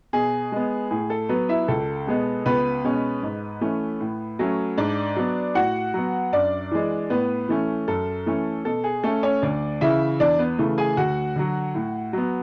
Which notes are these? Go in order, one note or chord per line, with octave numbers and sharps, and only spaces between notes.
B2 G#4
G#3 B3
A2 G#4
A4
F#3 B3 B4
E4 E5
C#2 A4
B2 G#3 B3
C#2 B3 B4
B2 G#3 C#4
G#2
E3 A3 C#4
A2
F#3 A3 C#4
G#2 D4 D5
F#3 B3
A2 F#4 F#5
F#3 B3
F#2 D4 D5
E3 G#3
A2 B3 B4
E3 A3 C#4
F#2 A4
E3 A3 C#4
B2 A4
G#4
A3 C#4 A4
C#4 C#5
D2 D4 D5
C#3 E3 E4 E5
E2 D4 D5
B3 B4
C#3 E3 A3
G#4 G#5
D2 F#4 F#5
D3 F#3
A2
F#3 B3